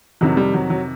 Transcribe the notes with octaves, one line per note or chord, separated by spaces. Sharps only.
F2 C3 D#3 F#3
G3
F#3
F#3